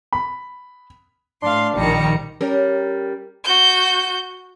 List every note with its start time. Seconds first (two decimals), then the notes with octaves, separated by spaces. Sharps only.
0.13 B5
1.42 A2 D4 F5 C6
1.75 A#1 D#3 F3 G3 A#5 C#7
2.41 G3 C#4 A#4
3.44 F#4 G6